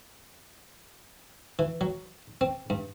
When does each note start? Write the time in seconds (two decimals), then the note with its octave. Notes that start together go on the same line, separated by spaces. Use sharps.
1.59 E3
1.81 F#3
2.41 C4
2.70 G2